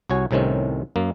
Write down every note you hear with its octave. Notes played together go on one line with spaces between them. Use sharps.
C2 F#4 C#5 G#5
C2 A2 C3 D#3 C4 C#4
F#2 A#3